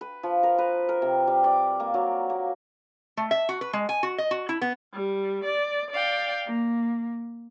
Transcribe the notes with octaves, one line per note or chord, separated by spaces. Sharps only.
B4
F3
A#4
B4
A#4
C3
G3
D5
A#3
F#3
A#3
A3
E5
F#4
B4
G#3
G#5
F#4
D#5
F#4
E4
B3
G3
D5
D5 F5 G5
A#3